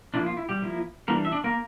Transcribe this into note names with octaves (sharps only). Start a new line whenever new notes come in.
F3 A#3 D4 E4 D5
F4
E4
G3 G4
F3 A#3 E4
E3 G3 A#3 D4 A#4
E5
D4 D5
A#3 A#4